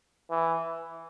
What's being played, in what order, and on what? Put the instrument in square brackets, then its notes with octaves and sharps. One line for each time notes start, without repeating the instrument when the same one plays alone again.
[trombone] E3